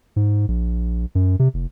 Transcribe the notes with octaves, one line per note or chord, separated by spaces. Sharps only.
G#2
A#1
F#2
C3
F1